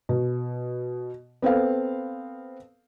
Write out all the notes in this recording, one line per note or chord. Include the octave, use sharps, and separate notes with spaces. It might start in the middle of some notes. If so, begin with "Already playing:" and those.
B2
B3 C4 A4 F5